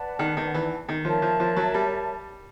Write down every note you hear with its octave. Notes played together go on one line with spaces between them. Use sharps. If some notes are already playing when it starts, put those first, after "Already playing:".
Already playing: B4 D5 F#5 A5
D#3
D#3
E3
D#3
F3 A#4 C#5 E5 A5
F3
F3
F#3
G3